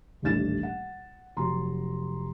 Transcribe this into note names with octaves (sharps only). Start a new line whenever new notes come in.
D#1 A1 A3 D4 A6 E7
F#5
F1 F#3 A#5 C6